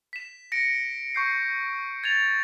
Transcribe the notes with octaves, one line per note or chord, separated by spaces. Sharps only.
B6 E7
A#6 C#7 D7
C#6 G6 C7
G#6 A6 F7